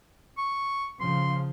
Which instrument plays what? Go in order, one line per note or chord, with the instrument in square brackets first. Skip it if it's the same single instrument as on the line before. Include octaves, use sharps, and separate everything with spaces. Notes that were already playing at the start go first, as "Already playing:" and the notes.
[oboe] C#6
[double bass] C#3 F3 [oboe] C6